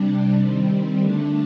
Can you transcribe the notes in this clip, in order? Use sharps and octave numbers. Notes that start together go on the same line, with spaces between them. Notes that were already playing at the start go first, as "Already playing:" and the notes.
Already playing: C3 G3 D4
D#3 G3 C4
D3 A3 D4